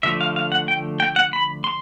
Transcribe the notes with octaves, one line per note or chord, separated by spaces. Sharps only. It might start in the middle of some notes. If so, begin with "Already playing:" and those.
D3 F3 A3 E5
F5
F5
F#5
G5
G5
F#5
B5
C6